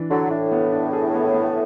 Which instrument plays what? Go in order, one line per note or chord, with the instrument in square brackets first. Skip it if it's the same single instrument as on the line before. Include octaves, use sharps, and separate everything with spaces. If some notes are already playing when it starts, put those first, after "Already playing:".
Already playing: [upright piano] E3 D4
[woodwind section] D3 F#3 [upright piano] D4
[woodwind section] A2 [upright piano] D4
[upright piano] B3
D4
G#4
B3
B3